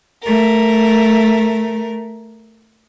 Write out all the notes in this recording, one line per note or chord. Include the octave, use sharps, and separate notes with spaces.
A3 A#4